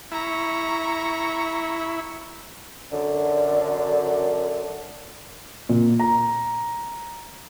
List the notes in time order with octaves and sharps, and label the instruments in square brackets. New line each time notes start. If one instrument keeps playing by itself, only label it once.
[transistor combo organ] E4 [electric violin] A#5 [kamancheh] C#6
[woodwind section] F#2 D3
[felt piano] A#2
A#5